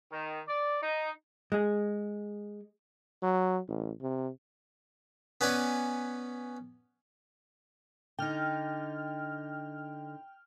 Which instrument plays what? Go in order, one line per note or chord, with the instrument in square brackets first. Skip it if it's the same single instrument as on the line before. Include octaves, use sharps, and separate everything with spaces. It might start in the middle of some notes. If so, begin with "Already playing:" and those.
[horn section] D#3
D5
D#4
[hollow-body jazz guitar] G#3 G#4
[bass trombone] F#3
A1
C3
[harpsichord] B3 C#4 B4 D5 G#5
[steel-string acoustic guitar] D3 D#4 [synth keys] G5 F6